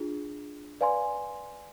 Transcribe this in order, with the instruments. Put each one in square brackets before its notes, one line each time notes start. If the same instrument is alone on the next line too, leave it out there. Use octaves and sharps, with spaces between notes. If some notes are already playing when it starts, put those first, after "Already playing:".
Already playing: [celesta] D4 F4 G#4
B4 D5 F5 G#5 C6